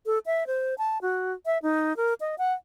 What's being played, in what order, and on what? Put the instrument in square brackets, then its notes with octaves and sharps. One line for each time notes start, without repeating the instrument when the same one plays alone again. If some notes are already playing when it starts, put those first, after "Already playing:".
[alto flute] A4
E5
C5
A5
F#4
E5
D#4
A#4
D#5
F#5